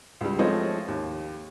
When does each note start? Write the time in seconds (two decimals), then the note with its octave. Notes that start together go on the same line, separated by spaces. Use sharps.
0.21 C#2 G3
0.39 F3 G#3 A3 C4 C#5 D#5
0.88 D#2